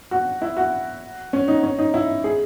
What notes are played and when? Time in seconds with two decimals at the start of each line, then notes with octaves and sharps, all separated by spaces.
0.11 F#4
0.42 E4
0.57 F#4
1.33 C#4
1.48 D#4
1.63 C#4
1.79 D#4
1.94 E4
2.24 G#4